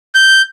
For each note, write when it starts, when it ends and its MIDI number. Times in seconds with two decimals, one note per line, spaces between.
0.15 0.42 91